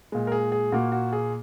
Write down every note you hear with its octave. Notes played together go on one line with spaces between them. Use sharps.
A#2 G#3
A#4
G#4
G#4
A#2 A#3 F#4
F#4
G#4